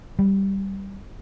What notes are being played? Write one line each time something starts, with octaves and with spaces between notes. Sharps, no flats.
G3